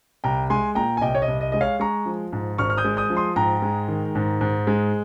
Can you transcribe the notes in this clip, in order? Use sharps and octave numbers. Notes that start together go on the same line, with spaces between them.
C2 G5 A#5
G#3 G#5 C6
A#2 G5 A#5
G#5
C2 D#5 G5
C#5
D#5
C2
D#5
G#3 D#5
C#5 F5
G#3 A#5 C#6
F3
G#2
G#1 C#6 F6
F6
D#6 G6
G#3
D#6 G6
F3
C6 D#6
G#2 G5 A#5
G#3
D#3
G#2
G#2
G#3